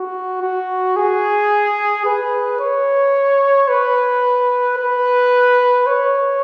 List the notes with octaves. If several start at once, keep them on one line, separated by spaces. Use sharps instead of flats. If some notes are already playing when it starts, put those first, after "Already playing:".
Already playing: F#4
F#4
G#4
B4
C#5
B4
B4
C#5